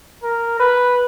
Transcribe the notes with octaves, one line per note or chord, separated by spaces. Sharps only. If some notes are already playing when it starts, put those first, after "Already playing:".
A#4
B4